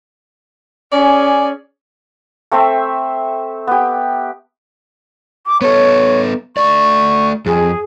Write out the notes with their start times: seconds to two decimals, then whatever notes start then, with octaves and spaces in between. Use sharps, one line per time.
0.92 C#4 G#4 D5
2.52 A3 C4 C5 E5
3.67 B3 G4
5.47 D6
5.62 B3 A4 C#5
6.57 A3 D5 C#6
7.46 F2 G#4